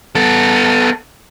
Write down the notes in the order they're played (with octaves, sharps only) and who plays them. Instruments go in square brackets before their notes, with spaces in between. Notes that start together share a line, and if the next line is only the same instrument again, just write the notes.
[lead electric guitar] B3 A4